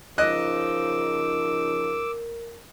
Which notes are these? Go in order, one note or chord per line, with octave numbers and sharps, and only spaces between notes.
C#3 F3 D#4 A#4 D#5 D6 E6 F#6